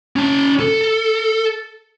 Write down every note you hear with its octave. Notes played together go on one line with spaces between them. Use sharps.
C#4 A5
A4